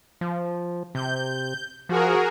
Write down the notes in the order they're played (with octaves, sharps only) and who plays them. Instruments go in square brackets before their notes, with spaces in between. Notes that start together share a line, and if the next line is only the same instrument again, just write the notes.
[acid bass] F3
[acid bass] C3 [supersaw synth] G6
[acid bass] F3 [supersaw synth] F#4 G#4 A#4